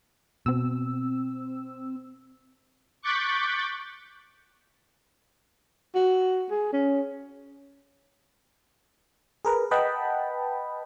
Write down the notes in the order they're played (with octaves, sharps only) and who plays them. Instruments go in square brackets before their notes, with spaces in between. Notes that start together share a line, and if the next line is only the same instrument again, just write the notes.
[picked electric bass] B2 [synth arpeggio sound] C4 E6
[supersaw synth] C#6 D6 F#6 G6 A6 B6
[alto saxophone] F#4
G#4
C#4
[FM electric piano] G#4 A#4 B4
B4 D#5 F#5 G5 A5 B5